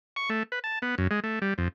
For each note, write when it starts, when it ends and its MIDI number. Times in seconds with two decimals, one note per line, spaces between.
0.16 0.30 85
0.30 0.43 57
0.52 0.59 71
0.64 0.79 81
0.82 0.95 59
0.98 1.08 42
1.11 1.20 56
1.24 1.39 57
1.42 1.54 55
1.58 1.68 41